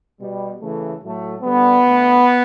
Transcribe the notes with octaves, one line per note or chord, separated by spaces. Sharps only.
B2 G3
C#3 E3 A3
A2 F#3 A3
D3 G3 B3
D3 A3